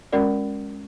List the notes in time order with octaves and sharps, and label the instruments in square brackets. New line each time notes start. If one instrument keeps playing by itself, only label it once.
[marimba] G#3 C#4 F#4 A#4 D5